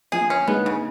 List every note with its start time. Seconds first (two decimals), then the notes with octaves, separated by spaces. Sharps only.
0.12 F3 G#4
0.30 C#4
0.47 G#3 B3 D#4
0.66 C#3